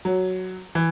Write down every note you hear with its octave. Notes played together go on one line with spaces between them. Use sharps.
F#3
E3